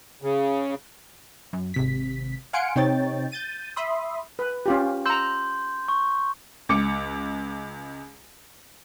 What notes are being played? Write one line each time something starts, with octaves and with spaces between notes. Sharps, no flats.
C#3
F#2
G#1 C3 B6
F5 F#5 G#5 C6 C#7 D7
C3 C4 D#4 C#5 G5 A6
G6 A6 D#7
E5 B5 C6 D#6
B4
C#4 F4 G4
A#5 C6 E6 G6
C#6
C#2 D6 C#7